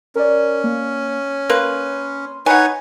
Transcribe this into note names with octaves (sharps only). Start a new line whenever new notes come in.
C#4 A#4 D5
A#3
A#3 B4 C6
D#4 B4 C#5 F#5 G#5